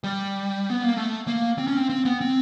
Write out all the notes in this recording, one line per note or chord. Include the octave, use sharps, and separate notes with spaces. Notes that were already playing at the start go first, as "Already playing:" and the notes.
G3
B3
A#3
A3
A#3
C4
C#4
C4
C4
B3
C4